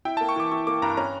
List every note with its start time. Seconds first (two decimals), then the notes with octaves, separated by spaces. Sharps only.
0.05 E4 G5
0.17 A#3 A5
0.29 C#6
0.36 E3 D6
0.52 E4 C#6
0.67 A#3 D6
0.82 G2 A#5
0.97 C#4 A#5